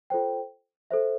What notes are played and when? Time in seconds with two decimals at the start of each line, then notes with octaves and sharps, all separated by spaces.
0.10 F4 A4 C5 G5
0.91 A4 C5 E5